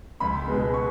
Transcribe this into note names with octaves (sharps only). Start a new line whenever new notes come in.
C#2 B5
B2 G#3 B3
C#6